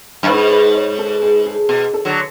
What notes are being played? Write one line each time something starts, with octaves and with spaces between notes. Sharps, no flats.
F#2
G#2 B4
B4
C#5
A4
G#4
G#4
B2 G#4
A4
D3 F#3